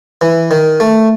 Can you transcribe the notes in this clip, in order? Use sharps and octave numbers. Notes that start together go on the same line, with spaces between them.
E3
D#3
A3